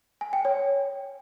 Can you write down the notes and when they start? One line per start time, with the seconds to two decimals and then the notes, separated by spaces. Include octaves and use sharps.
0.21 G#5
0.33 G5
0.45 C#5